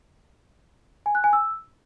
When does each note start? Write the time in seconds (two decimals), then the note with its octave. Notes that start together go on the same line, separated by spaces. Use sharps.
1.06 G#5
1.15 F#6
1.24 G#5
1.33 E6